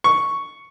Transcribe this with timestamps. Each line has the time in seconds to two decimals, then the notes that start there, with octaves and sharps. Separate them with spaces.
0.04 C#6